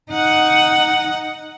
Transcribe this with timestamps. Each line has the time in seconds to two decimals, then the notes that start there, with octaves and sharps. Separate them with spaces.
0.10 D#4 F#5